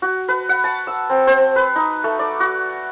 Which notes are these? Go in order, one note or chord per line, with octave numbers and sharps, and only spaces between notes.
F#4
B4
F#5
A5
E6
C4
C5
B4
D#4
A3
D5
F#4